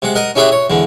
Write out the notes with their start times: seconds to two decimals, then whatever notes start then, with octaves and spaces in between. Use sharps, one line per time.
0.02 C3 G#3 F#5
0.15 A#4 D#5 F#5
0.36 C#4 E4 G4 G#4 E5 F#5
0.52 C#5
0.70 E2 D3 G#3